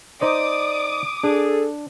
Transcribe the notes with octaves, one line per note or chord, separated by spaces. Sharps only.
D#4 C5 D5 D#5 D6 D#6
D4 G#4 A4